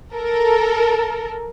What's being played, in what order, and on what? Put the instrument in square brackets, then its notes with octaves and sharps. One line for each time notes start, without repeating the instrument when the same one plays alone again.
[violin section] A4 A#4